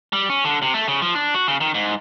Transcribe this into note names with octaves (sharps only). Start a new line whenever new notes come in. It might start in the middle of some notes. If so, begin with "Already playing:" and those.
G3
C#4
D3
C3
A3
C#3
F3
D4
F#4
C#3
D#3
G#2